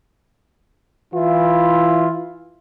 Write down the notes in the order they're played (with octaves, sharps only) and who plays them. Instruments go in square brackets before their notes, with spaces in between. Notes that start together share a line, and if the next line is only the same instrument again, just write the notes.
[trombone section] E3 E4 F4